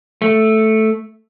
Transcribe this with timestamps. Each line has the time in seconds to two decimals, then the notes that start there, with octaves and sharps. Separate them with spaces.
0.22 A3